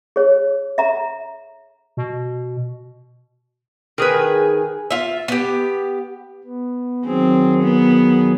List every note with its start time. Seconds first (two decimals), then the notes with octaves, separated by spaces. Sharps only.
0.16 G#4 C#5
0.78 E5 A#5
1.97 B2
3.98 D#3 G#4 A#4 B4
4.91 F4 E5
5.28 B3 G4
6.44 B3
7.05 D#3 F#3 C4 G#4
7.62 B3